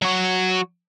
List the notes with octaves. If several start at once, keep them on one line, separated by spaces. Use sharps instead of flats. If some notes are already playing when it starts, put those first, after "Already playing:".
F#3 F#4